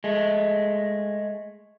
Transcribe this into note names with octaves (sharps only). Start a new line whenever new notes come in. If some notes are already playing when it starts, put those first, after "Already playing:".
G#3 A3